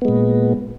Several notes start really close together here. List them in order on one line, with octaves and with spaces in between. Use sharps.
B3 G#3 A#2